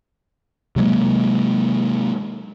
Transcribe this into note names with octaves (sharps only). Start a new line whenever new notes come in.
C3 F#3 G#3 A#3